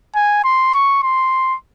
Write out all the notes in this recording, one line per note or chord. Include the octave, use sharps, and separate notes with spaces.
G#5
C6
C#6
C6